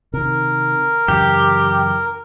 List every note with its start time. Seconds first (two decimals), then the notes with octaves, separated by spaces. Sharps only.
0.14 C3 D#3 A#4
1.08 F#2 C#3 E3 G4